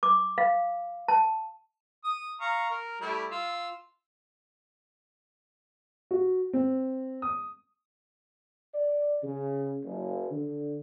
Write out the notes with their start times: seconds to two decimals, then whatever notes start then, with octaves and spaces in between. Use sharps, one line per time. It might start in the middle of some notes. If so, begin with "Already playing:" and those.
0.03 D6
0.38 F5
1.08 A5
2.04 D#6
2.41 F5 A#5 C#6
2.70 A#4
3.01 G3 A3 E4
3.31 F4 E6
6.11 F#4
6.53 C4
7.22 D#6
8.73 D5
9.22 C#3
9.83 F#1
10.30 D3